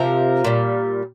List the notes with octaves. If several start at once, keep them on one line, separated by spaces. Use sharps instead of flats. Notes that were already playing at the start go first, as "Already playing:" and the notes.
Already playing: C3 F3 A#4
A#2 G3